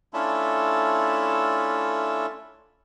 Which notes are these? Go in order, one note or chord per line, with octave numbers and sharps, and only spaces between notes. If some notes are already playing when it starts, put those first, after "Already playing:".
A3 C#4 D4 E4 F4 A4